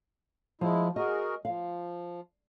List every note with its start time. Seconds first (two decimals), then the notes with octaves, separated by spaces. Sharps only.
0.61 F3 G#3 E4
0.96 F#4 G#4 A#4 D#5
1.45 F3 F5